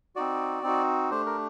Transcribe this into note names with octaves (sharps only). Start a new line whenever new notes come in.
C4 D#4 F#4 D5
C4 D#4 F#4
A3 D4 G4 C5
A#4